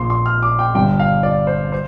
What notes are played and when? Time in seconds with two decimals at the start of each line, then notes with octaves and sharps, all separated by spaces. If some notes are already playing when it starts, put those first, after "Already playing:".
Already playing: A#1 A#2 C6
0.10 C6
0.26 F6
0.43 D6
0.59 G5
0.74 G1 G2 D3 G5
0.99 F5
1.23 D5
1.47 C5
1.72 C5